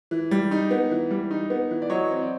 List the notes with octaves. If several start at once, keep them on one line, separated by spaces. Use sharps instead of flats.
E3
G3
D#4
B3
E3
G3
D#4
B3
E3
D5
F#3 C#5 D#5
C4
D5